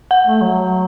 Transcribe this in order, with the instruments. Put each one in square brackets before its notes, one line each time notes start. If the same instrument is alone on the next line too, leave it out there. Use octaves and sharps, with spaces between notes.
[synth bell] F#5
[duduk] A3
F#3